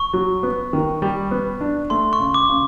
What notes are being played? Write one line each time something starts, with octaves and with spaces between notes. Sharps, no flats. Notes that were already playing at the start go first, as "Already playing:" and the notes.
Already playing: C#6
F#3
B3
D#3
G3
B3
D4
A3 C6
C#6
C#3
D6
C#3